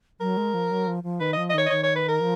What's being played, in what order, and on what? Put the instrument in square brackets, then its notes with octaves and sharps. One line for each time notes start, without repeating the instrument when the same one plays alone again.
[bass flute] F#3 [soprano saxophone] A#4
[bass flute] G#3
F3
F#3
F3
F3
[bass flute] D#3 [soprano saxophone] B4
[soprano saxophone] D#5
[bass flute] F3
[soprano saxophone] D#5
[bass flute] D#3 [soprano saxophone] C#5
[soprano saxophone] D#5
[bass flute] D#3 [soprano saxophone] C#5
[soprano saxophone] C#5
B4
A#4
[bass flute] F3